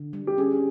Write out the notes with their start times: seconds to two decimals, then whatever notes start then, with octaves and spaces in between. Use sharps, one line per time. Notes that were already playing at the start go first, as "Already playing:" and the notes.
Already playing: D3
0.13 G3
0.27 G4
0.38 C#4 G#4